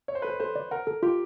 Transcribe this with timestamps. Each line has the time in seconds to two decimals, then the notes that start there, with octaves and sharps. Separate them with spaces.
0.08 C#5 D5
0.15 C5
0.22 A4 B4
0.30 C5
0.40 A4 C5
0.56 D5
0.71 A#4 F#5
0.87 A4
1.03 F4 G4